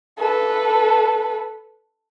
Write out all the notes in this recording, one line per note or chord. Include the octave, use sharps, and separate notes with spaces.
A4 B4